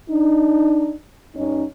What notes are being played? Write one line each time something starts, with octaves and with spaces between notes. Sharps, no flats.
D4 D#4
G2 C#4 D#4